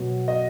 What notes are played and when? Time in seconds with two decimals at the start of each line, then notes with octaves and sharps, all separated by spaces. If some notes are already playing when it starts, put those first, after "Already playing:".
Already playing: B2 F#3
0.28 D#5